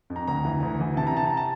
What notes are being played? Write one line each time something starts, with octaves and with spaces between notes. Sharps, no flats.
F2
A#5
D2 A#5
E3
D2
E3
C3 A5
A#5
C3 A5
A#5
A5